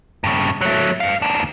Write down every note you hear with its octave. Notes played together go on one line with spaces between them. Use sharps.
G2 C#3
F#3 A3
G2 F5
D#2 D4